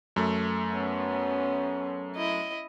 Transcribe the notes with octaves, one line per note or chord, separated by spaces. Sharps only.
F#2 A3
B3 C#4
E4 D#5